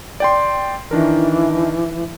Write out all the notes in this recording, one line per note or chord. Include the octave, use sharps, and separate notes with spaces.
D5 G5 C6
D#3 E3 D4 A#4